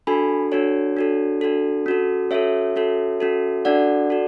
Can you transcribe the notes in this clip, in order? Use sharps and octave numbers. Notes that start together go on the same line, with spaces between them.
D4 F#4 A4 G#5 B5
D4 F#4 A4 C#5
D4 F#4 A4
D4 F#4 A4
C#4 F#4 A4
C#4 F#4 A4 C#5 E5
C#4 F#4 A4
C#4 F#4 A4
D4 F#4 A4 D5 F#5
F#4 A4